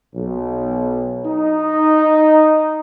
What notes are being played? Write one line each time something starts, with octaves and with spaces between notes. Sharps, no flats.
B1
D#4